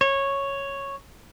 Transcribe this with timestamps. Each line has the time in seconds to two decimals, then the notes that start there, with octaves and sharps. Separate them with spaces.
0.01 C#5